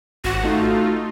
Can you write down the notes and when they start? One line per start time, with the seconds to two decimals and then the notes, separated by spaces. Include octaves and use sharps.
0.24 G#1 F#4 F#5
0.43 A3 D#4 F4